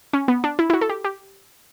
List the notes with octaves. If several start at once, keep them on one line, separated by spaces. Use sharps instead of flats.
C#4
B3
D4
E4
E4
F#4
A4
G4
G4